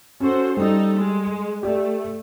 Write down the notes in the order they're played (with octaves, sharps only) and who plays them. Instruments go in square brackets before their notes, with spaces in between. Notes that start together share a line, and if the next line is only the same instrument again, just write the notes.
[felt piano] C#4 [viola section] F#4 A4 C5
[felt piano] G3 [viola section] D#4 A4
[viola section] G#3
[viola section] A3 [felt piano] G4 D5